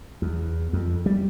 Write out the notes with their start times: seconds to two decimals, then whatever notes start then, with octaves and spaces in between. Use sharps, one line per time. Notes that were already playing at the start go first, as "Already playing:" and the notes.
0.22 E2
0.73 F2
1.06 G3